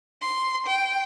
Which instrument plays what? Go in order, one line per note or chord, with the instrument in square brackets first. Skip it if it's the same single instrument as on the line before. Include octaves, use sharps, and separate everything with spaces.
[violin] C6
G5